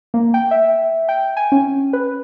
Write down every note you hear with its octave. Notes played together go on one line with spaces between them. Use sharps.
A#3
G5
E5
G5
G#5
C#4
B4